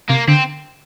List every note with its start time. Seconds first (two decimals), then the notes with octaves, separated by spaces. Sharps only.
0.10 C3 A#3
0.28 D3 C4